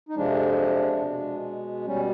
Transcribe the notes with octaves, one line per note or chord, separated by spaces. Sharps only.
D#4
F2 C3 F3 G#3 D4
B2 G#3
B2 G3 C#4